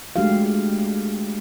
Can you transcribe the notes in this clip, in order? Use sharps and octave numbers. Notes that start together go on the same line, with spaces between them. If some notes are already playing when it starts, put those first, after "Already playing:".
G#3 A3 D4 F#4 G4 F5